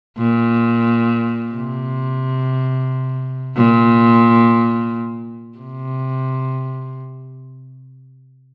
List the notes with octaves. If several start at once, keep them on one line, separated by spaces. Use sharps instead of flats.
A#2
C3
A#2
C3